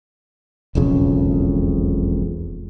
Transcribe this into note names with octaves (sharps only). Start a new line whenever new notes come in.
E1 B1 F2 C#3